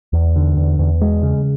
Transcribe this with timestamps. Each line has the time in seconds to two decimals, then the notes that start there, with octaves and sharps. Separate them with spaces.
0.13 E2
0.36 D3
0.57 E2
0.79 E2
1.01 G#3
1.23 C#3